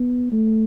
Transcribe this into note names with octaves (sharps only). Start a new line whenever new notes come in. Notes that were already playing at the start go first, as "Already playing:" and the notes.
Already playing: B3
A3